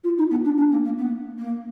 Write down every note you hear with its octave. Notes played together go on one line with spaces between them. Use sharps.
F4
D#4
B3
D4
D4
A#3
A#3
B3
A#3